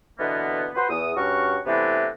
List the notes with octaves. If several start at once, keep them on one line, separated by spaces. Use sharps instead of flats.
B2 D3 E3 A#3 B3
F#4 B4 C5
E2 D#6
G2 C#4 F#4 A#4 F#5 C#6
C3 E3 A3 B3 C4 D4